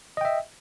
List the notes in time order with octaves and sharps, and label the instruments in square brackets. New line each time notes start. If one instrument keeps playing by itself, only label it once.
[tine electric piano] D#5
G5
E5